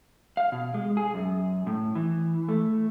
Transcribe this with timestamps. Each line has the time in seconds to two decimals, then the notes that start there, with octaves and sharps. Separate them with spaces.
0.37 F5
0.52 B2
0.74 G#3
0.97 G#4
1.14 F#2
1.67 A2
1.95 E3
2.49 A3